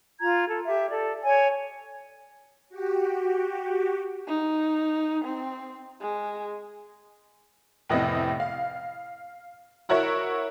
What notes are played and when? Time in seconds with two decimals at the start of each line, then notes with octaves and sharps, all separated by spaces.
0.20 F4 A#5 G#6
0.47 A4
0.66 G4 E5
0.89 A4 D5
1.24 C#5 G#5
2.69 F#4 G4
4.27 D#4
5.24 C4
6.01 G#3
7.90 F1 A2 C3 B3 D#5 A#6
8.40 F5
9.89 E4 F#4 A#4 C#5 E5